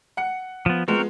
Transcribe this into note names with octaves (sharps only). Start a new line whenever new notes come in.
F#5 C#7
F3 B3
F3 G#3 B3 C4 F#4 A#4